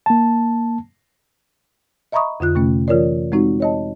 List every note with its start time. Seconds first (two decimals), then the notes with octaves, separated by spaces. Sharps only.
0.06 A#3 A5
2.12 D#5 E5 A#5 B5 C#6 D#6
2.40 F2 D3 F4 F#6
2.55 C3 A3 C#4
2.88 E3 F4 A#4 C#5 D5
3.32 G#3 C4 D#4 F#4
3.60 C#5 D#5 A5